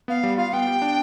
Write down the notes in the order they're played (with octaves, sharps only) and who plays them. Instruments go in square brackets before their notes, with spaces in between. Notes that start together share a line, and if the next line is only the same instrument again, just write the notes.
[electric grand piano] B3 [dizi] F5
[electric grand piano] G3
[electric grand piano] F4 [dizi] F5
[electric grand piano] B3 [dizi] G5
[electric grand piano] G4
D4